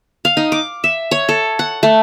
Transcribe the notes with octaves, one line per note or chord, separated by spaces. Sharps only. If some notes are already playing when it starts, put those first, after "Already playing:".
F5
D#4
D6
E5
C#5
A4
F#5
A3